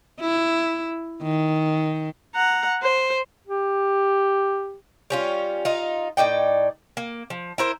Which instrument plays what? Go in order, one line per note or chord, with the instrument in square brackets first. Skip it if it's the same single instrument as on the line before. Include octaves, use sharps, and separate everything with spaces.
[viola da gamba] E4
D#3
[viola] F#5 A#5
C5
[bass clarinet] G4
[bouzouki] G3 C#4 F4
D#4 F4
A2 D#4 D5 G5
A#3
F3
E4 A#4 C5